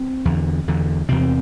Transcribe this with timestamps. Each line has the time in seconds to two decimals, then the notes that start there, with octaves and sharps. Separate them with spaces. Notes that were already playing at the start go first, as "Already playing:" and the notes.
Already playing: C4
0.25 E2 D3
0.68 E2 D3
1.08 E2 C3 C4